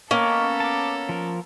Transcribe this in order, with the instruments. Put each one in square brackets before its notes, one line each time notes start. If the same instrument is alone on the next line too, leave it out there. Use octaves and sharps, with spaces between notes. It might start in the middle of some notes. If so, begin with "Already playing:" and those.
[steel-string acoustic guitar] A#3 [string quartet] B3 A4 A#5 [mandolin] C#4 [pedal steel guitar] D#5 G5 D6
[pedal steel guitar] A5 D6
F3 A#4